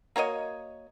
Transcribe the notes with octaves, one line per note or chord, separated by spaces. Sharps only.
A#3 F#4 C#5 D#5